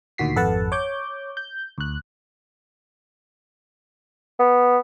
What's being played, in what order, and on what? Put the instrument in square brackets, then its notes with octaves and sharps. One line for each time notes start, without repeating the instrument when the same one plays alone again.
[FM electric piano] D2 A#2 D#3 F#4 B6 C7
G#1 F2 A4 B4 F#5 A5
C#5 D6 G6
G6
D2 F#6
[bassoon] B3